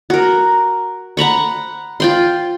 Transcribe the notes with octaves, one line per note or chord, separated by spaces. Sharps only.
F#4 A#4
F#5 A#5 B5 C#6
F4 G5 C6